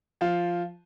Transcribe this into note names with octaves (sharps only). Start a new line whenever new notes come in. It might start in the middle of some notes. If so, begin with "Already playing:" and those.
F3 F4